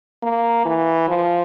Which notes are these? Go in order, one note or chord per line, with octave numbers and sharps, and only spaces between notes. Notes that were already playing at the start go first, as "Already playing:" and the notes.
A#3
E3
F3